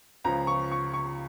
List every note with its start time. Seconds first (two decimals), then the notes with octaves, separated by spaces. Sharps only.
0.25 C#2 C#3 F3 A#5
0.47 C#6
0.71 C#6
0.93 C#6